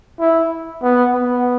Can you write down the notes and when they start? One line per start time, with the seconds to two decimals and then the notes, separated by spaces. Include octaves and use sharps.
0.20 E4
0.82 B3
1.14 B3